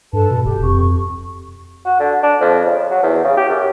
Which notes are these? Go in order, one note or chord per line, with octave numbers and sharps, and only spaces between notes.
G2 A4 B4 A5
B2
D#1 G4
F2 C#6
F#4
D3
D4
F2
C#3
F#3
E2
C#3
G4
F#2